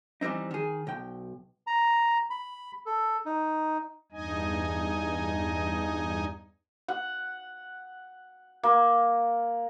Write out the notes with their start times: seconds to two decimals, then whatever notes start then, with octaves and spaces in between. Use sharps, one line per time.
0.21 E3 G3 A3 C4 D#4
0.51 D#3 G#4
0.87 B1 G5
1.67 A#5
2.30 B5
2.86 A4
3.25 D#4
4.12 E2 G2 D#4 D#5 G#5
6.88 F#5
8.63 A#3